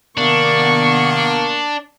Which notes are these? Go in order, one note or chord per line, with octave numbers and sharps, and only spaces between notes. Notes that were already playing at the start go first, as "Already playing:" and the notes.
C3 D#3 A#3 B3 D4 C#6